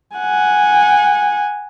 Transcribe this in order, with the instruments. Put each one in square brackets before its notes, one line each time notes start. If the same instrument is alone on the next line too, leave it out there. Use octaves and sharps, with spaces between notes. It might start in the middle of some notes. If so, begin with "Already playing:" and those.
[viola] F#5 G#5